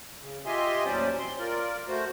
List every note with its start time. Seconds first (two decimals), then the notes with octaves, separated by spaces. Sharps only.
0.21 C#3
0.46 F4 G4 D#5 E5 G#5 C6
0.85 D#2 A2 F#3 C#4 C5 D5
1.18 C4 C6
1.39 F4 A#4 D5
1.88 A3 F#4 C5